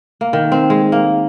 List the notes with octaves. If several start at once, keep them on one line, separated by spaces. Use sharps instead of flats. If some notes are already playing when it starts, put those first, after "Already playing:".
A#3
D#3
C4
G#3
A#3